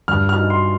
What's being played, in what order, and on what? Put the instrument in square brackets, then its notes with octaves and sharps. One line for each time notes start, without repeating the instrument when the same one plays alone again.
[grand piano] G2 F6
F6
D#4
C6